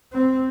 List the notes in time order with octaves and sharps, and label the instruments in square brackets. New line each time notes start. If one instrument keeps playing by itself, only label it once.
[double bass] C4